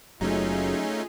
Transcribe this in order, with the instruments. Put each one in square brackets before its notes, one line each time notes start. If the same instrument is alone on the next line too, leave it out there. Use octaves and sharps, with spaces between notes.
[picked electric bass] F#1 F#3 [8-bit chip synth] A3 C#4 D#4 [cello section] F4 G#4